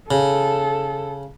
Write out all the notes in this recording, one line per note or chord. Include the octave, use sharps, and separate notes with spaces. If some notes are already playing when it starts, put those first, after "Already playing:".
C#3 A4